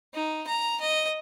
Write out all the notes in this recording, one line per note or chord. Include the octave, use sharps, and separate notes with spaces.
D#4
A#5
D#5